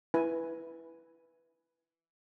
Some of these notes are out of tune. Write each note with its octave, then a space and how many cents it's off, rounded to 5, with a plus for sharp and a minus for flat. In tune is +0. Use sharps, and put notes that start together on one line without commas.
E4 +5 B4 +0 G#5 +0